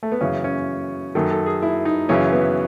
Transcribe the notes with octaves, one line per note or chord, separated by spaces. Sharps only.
A3
B3
F#2 C#3 E3 C#4
C#4
F#2 D#3 A4
A4
G#4
E4
D#4
F#2 C#3 E3 C#4
B3